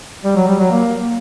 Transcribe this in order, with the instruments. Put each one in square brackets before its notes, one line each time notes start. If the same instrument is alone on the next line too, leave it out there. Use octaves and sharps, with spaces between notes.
[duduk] G3
F#3
G3
F#3
A#3